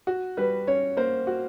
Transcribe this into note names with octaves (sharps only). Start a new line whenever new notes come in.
F#4
G3 B4
C#4 C#5
A#3 C5
F#4